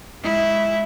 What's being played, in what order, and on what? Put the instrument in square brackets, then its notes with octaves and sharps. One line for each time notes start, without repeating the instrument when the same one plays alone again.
[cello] G#3 E4